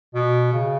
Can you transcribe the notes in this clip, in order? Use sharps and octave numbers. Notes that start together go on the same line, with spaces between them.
B2
C#3